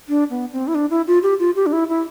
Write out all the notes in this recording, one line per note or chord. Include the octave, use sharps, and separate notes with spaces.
D4
B3
C4
E4
D4
E4
F4
G4
F4
G4
D4
E4
E4